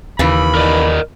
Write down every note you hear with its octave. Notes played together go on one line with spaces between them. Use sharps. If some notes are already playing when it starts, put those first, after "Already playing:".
D#2 C#3 E3 B5
A#4 D5 D#5